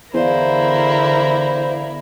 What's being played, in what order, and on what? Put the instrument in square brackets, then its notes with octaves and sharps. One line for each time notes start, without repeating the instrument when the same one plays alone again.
[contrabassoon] E2 [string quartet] D3 E4 A#4 [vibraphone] B3 D5 F5 [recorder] C5